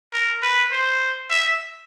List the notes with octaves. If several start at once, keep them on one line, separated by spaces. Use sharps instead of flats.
A#4
B4
C5
E5